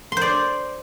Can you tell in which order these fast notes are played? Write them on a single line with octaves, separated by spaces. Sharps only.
C6 C5 D5